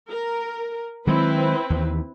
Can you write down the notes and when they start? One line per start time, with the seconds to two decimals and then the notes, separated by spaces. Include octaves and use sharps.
0.10 A#4
1.07 D#3 F#3 G#3 C4 E4 B4
1.70 D#2 E3